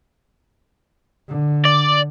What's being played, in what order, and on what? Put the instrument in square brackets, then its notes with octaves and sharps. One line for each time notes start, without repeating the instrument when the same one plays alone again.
[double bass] D3
[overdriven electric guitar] D5